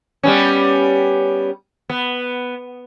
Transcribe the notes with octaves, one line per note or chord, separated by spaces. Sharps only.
G3 B3 C#4
B3